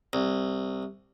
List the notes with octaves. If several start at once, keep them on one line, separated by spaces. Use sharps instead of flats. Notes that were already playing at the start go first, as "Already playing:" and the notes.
C2